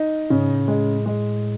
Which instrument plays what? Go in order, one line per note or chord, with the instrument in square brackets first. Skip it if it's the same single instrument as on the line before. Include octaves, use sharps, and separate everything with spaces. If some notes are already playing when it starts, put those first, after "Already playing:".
Already playing: [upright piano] D#4
[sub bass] G#2 [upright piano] C#3
[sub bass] A2
[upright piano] G#3
G#3